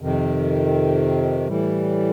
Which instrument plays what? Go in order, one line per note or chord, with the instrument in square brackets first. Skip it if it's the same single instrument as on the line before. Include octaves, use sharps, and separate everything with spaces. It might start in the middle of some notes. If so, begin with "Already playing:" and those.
[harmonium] F2 C3 D#3
A2 E3 G3